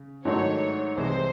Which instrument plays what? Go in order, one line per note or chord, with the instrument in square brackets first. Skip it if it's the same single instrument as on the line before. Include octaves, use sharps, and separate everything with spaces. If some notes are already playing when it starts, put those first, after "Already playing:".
Already playing: [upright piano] C#3
[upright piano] G#2 D#3 F#3 A3 D4 [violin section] C#5
[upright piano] C2 C3 E3 G#3 [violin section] C5